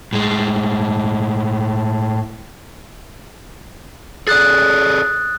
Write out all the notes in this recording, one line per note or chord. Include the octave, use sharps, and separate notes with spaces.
A2 G#3
G#4 A4 D5 D#6 F#6 A6